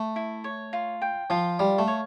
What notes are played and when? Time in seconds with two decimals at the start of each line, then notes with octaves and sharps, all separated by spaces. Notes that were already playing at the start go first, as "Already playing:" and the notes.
Already playing: A3
0.16 E4
0.44 C#5
0.73 F4
1.02 G5
1.30 F3 F4
1.59 G3 F5
1.79 A3
1.88 C#5